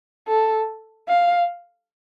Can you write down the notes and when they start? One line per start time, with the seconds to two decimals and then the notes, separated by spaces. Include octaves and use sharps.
0.28 A4
1.08 F5